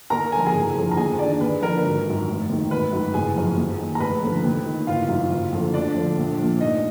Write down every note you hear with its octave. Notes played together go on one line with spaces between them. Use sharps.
D#2 A#4 A#5
D3 G#5
F3 A#5
G#4 G#5
F#1
F2 D3 F3
A#5
D#2 G#4 G#5
D#3 D4 D5
D#2 B4
D3 F3 A#4
G#1
F#2 D#3
F1
D#2 D#3
G#1 B4
F#2 D#3
F#1 G#4 G#5
F#2 F3
D#2
D#3
A#5
F1 B4 B5
D#2 D3 F3
D#2
D#3
F#1 F4 F5
F#2 D#3
F#1
F2 D3
D2 D4 D5
D3 F3
A#1
A#2 F3
F1 D#4 D#5